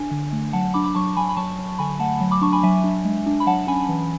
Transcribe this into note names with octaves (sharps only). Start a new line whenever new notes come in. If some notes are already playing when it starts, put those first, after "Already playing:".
Already playing: D4 G#5
D3
A3
F#3 F#5 A5
D4 B5 D6
B5 D6
F#3 A5 C#6
F#3 G#5 B5
B5
F#3 A5 C#6
F#3
D3 G#5 B5
A3 F#5 A5
F#3
B5 D6
D4 A5 C#6
G#5 B5
F#3 E5 G#5
D4
G#3
D4
B5
F#3 F#5 A5
C#4 G#5 B5
E3